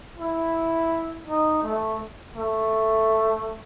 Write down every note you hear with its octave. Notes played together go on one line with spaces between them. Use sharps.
E4
D#4
A3
A3